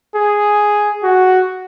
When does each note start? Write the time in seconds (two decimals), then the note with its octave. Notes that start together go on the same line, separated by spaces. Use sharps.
0.14 G#4
1.03 F#4